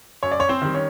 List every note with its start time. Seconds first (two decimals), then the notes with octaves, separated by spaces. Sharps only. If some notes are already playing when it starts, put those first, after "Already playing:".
0.23 F#2 C#5
0.32 D5
0.39 C#4 C#5
0.49 C4 C5
0.62 D#3 G3
0.75 C#4 C#5